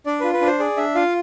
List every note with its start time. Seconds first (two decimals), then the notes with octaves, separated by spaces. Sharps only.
0.06 D4 D5
0.20 F4 B4
0.33 B4
0.41 D4 C5
0.59 G#4 D5
0.77 D4 E5
0.95 F4 F5